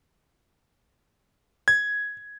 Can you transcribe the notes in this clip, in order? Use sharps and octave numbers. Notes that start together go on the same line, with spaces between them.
G#6